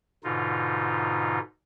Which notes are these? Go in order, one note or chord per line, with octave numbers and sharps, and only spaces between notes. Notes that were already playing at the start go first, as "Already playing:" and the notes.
G#2 B2 D3 D#4 F4